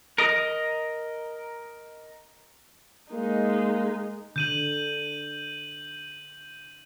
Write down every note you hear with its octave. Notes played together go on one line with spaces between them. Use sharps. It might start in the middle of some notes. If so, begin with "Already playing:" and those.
A#4 D#5
G#3 A#3 D#4
D3 G6 D#7 F#7